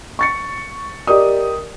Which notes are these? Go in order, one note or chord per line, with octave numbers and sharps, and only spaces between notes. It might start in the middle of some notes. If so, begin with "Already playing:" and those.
C#6 A6 C#7
G4 A#4 D5 D#5 D#6